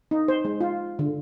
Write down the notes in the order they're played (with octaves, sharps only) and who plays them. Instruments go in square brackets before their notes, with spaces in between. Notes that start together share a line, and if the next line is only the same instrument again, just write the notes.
[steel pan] D#4
C5
G#3
F4
D3